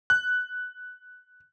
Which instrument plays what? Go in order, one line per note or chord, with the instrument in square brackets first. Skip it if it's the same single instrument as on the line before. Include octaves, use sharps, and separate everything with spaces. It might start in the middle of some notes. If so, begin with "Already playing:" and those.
[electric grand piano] F#6